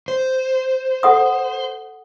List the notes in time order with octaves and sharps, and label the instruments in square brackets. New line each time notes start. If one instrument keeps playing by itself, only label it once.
[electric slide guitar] C5
[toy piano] A4 F#5 D#6